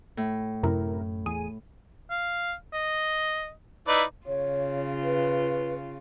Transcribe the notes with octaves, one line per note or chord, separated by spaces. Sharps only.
A2
F#2 C3 E4 A#4
E2 G#4 D#7
F5
D#5
D#4 E4 B4 D5
C#3 F4 C#5
B4